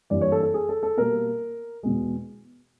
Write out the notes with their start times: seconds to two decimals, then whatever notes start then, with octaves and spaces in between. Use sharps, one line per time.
0.10 G2 E3 G3 A#3 D5
0.21 C#5
0.32 A4
0.43 A4
0.54 G#4
0.69 A4
0.83 A4
0.97 B2 G3 A#3 A#4
1.83 E2 B2 G#3